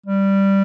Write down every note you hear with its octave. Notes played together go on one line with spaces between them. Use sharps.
G3